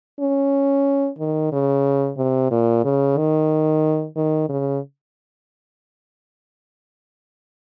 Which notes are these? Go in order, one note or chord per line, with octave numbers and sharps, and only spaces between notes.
C#4
D#3
C#3
C3
A#2
C#3
D#3
D#3
C#3